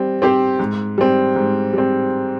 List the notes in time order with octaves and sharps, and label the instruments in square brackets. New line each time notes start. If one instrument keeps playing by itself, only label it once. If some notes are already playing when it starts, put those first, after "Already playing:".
Already playing: [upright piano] G3 C4
C4 G4 C5
G#2
G3 C4
G#2
G3 C4